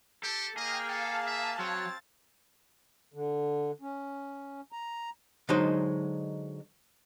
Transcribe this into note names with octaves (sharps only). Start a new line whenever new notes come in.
G4 A4
A#3 G#4 D#5 G5 F6
A4 F5 A5
E5
F#3 C4 C#5 A6
D3
C#4
A#5
D3 F#3 G#3 D#4 C5